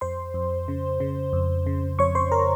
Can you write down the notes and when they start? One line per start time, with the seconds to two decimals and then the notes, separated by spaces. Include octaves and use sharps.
0.01 F2 C5 C6
0.34 F2
0.68 C#3
1.00 C#3
1.33 F2
1.66 C#3
1.99 F2 C#5 C#6
2.15 C5 C6
2.32 A#4 A#5